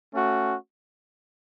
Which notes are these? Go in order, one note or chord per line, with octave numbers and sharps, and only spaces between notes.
A3 C#4 F#4